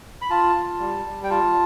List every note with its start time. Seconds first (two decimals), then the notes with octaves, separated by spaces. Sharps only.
0.21 B5
0.30 F4 A5
0.56 F4
0.80 G3
1.06 G3
1.24 G5
1.30 F4 A5